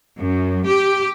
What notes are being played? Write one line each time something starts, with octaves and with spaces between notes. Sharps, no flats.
F#2
G4